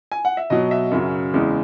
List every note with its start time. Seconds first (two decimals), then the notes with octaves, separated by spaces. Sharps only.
0.12 G#5
0.25 F#5
0.37 E5
0.50 B2 F#3 D#5
0.71 E5
0.91 F#2 C#3 F#3
1.34 E2 C#3 G#3